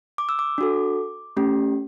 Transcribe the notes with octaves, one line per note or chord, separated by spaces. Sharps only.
D6
E6
D6
D4 F#4 A4
A3 C#4 G4